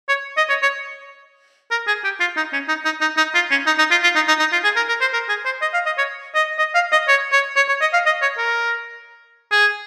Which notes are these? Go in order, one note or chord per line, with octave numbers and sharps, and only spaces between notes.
C#5
D#5
C#5
C#5
A#4
G#4
G4
F4
D#4
C#4
D#4
D#4
D#4
D#4
F4
C#4
D#4
D#4
F4
F4
D#4
D#4
D#4
F4
G#4
A#4
A#4
C5
A#4
G#4
C5
D#5
F5
D#5
C#5
D#5
D#5
F5
D#5
C#5
C#5
C#5
C#5
D#5
F5
D#5
C#5
A#4
G#4